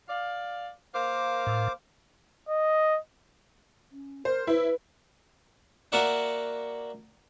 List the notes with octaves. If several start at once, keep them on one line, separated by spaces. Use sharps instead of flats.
D5 F5
A#3 C5 F5 D6
A2
D#5
C#4
A#4 C5
E4 B4
A#3 F#4 A#4 D5 E5 F#5